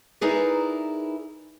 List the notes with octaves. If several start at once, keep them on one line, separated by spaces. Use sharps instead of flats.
D#4 E4 G#4 A#4 B4 D5